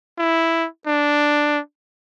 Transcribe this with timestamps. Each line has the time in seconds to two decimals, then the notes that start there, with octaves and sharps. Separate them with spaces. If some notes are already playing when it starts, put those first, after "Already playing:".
0.18 E4
0.87 D4